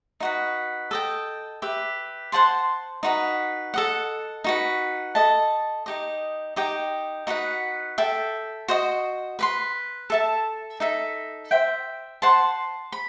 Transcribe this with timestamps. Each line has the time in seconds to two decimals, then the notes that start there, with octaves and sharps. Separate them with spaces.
0.20 D#4 F#4 B4
0.91 A4 D#5 G5
1.62 G4 B4 E5
2.32 C5 F#5 A5 C6
3.03 D#4 F#4 B4
3.74 A4 D#5 F#5
4.44 D#4 F#4 B4
5.15 A4 D#5 A5
5.86 D#4 G4 D#5
6.56 D#4 G4 D#5 G5
7.27 D#4 F#4 B4 F#5
7.98 A4 E5 G5
8.68 F#4 C5 D#5
9.39 B4 F#5 C6
10.10 A4 E5 A5
10.80 D#4 A4 E5
11.51 C5 E5 G5
12.22 C5 F#5 A5 C6
12.92 B5